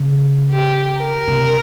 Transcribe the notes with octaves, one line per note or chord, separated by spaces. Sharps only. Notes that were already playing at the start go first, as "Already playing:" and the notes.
Already playing: C#3
G4
A#4
C3